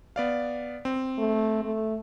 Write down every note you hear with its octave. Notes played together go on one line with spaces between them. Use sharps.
B3 D5 F5
C4
A3
A3